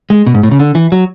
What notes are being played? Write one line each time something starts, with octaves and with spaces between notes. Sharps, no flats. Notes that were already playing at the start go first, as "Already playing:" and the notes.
G#3
B2
G#2
A2
C#3
D3
E3
F#3